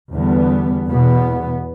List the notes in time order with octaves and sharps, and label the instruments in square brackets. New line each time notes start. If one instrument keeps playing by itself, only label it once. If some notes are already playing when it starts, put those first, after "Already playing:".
[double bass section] E2 D3 G3 B3
E2 B2 B3